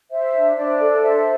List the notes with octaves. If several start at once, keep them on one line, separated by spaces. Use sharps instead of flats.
C5 E5
D4
D4 D5
A4
C5 E5